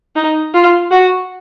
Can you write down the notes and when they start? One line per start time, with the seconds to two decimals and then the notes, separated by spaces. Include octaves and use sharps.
0.16 D#4
0.54 F4
0.91 F#4